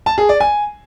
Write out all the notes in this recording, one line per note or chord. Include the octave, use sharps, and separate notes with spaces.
A5
G#4
D5
G#5